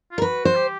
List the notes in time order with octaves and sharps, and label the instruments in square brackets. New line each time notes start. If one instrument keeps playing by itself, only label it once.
[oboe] F4
[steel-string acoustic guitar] A#4
[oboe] F#4 [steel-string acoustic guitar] B4
[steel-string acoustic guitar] C5
[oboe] G4